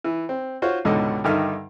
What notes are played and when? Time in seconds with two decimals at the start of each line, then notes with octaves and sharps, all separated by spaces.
0.04 E3
0.29 C4
0.62 F4 F#4 C5 C#5
0.85 C#2 G#2 B2 D3 D#5
1.24 G2 D3 D#3 D#4 E5 F6